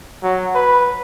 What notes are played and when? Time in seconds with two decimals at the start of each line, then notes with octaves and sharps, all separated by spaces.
0.23 F#3
0.55 B4